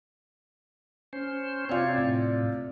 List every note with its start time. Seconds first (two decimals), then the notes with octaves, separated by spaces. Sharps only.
1.13 C#4 C5
1.69 C3 C4 F4 C#5 D5
1.98 A2